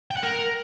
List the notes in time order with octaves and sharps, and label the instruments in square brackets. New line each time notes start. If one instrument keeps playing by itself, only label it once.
[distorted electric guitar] G5
F#5
A#4